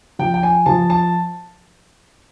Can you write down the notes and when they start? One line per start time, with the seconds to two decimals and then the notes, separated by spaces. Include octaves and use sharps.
0.19 F3 G5
0.34 G5
0.43 G#5
0.66 F3 A5
0.90 A5